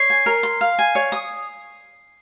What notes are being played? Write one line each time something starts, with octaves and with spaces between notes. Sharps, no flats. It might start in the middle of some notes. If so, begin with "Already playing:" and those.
Already playing: C#5 C7
G#5
A#4
C6
F5
G#5
C#5
D#6